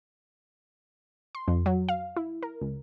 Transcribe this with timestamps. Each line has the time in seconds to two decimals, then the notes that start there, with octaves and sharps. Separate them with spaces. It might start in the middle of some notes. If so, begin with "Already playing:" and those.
1.35 C6
1.48 F2
1.66 F#3
1.89 F5
2.16 E4
2.43 A#4
2.61 C#2